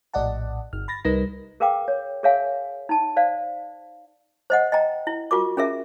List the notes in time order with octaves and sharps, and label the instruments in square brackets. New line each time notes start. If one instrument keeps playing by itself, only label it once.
[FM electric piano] A#1 A2 D5 D#5 F#5 A5
G1 F6
B5 A6 A#6
C2 G3 D#4 A#4 B4 A#6
[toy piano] G#4 A#4 B4 F5 G5 D6
C#5
G#4 A#4 C#5 E5 F5 G#5
D#4 A5
C5 D5 F5
C5 D#5 F#5
D#5 G5 A#5
E4
F4 F#4 A#4 C#6 D6
C#4 G#4 A#4 E5